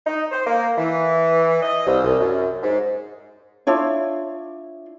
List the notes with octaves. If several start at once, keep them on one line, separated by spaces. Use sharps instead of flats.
D#4
C5
A#3
E3
D#5
C2
C2
F#2
G#2
D4 E4 F4 C#5